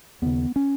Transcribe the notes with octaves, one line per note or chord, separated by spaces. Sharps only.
D#2 C#3 B3
C#4